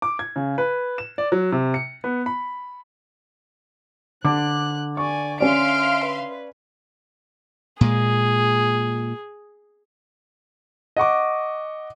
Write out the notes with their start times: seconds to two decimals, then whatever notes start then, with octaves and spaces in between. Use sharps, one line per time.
0.02 D6
0.19 G#6
0.36 C#3
0.58 B4
0.98 E7
1.18 D5
1.32 F#3
1.52 C3
1.74 C#7
2.04 B3
2.26 B5
4.25 D3 D6 F#6
4.97 D5 G#5 C#6
5.40 C#4 D5 E5 F5 C6 F6 D7
6.04 B4
7.81 A#2 G#3 G#4
10.97 D#5 F#5 C#6 D6